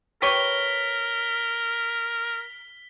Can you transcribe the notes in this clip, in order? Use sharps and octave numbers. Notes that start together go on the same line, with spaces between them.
G4 A#4 B4 C#5 B6 G7